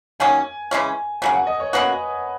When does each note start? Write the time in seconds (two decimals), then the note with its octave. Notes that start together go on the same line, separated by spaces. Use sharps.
0.20 D#3 F#3 A#3 C#4 G#5
0.71 C#3 E3 G#3 C#4
1.22 C#3 F#3 A#3 G#5
1.34 F#5
1.47 D#5
1.60 C#5
1.73 B2 A#3 C#4 F#4 B4